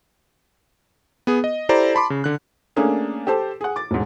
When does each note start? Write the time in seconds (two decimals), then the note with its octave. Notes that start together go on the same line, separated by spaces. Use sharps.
1.27 B3 G#4
1.44 D#5
1.69 E4 G4 A4 C5 D5 A#5
1.95 A5 B5 C6 D6
2.10 C#3
2.24 D3 F#6
2.76 A3 A#3 C#4 D4 G#4
3.27 G4 A4 C5 A5
3.61 G#4 F#5
3.76 D6 A6
3.91 E1 G#2